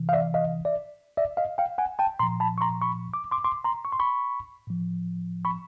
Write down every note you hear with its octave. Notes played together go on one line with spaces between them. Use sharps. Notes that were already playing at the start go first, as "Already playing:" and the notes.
Already playing: C3 E3
F5
D5 E5
D#5 F5
D5 E5
D5 E5
D#5 F5
F5 G5
F#5 G#5
G5 A5
A#2 F3 A#5 C6
A5 B5
C#6
A#5 C6
B5 C#6
D6
C6 D6
C6 D6
A#5 C6
C#6
C6
B5 C#6
A2 F3
B5 C#6